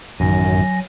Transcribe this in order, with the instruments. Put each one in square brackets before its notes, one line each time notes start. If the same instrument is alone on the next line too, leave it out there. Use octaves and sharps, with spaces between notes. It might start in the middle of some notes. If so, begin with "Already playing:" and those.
[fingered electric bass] A1 D#3 [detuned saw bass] F#2 [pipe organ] F#3 G#5 A#6